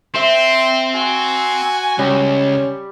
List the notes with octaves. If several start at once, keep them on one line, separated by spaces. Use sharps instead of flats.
C4 C5 E5 C6
F#4 G#5
C#2 G3 C#4